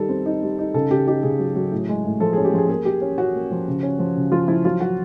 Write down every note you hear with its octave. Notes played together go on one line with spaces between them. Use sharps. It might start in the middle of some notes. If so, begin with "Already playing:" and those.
Already playing: D#3 G3 A4
C4
D#4
G3
D#4
C#3 A4
C#3 G4
D#4 G4
C#3 G#4
F#3
F#3
A2
G#3
A2
F3 A4
G#4
C#4
G4
F3 G#4
A#3 G#4
A#3 G4
C#4
C#4 F#4
A#3
F3
C#3
C#4
F3
C#3
F3 F4
F3 E4
F#3 F4
F#3 F#4